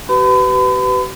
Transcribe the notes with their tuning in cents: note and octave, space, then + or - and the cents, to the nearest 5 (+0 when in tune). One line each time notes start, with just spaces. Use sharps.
G4 -45 B4 +15 B5 +40